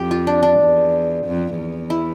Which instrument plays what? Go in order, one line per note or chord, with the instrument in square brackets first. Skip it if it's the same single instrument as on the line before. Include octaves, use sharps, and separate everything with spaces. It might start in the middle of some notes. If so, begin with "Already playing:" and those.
Already playing: [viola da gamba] F2 [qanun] G4
[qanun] F4
D4
D4
[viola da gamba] E2
F2
E2
[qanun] E4